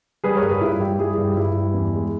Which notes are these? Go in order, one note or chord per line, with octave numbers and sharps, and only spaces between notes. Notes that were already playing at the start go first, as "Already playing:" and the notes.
G3 G#4 B4
A#4 C#5
G2
G#4 B4
G2 E4
E4
G3 G4
G3 E4 G#4
G2
G4
G2 E4
G3
E2
G#3